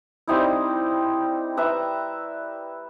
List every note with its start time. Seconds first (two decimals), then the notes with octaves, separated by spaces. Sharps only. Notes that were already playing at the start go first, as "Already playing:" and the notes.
0.28 G3 C4 D#4 E4
1.57 B4 E5 A#5